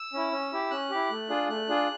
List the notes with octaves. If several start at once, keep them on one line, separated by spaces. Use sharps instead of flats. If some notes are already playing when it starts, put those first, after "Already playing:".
Already playing: E6
C#4 E4
C#4
E4 G4
C#4 F#6
E4 G4
A3
D4 F4 G#4
A3 F#6
D4 F4 G#4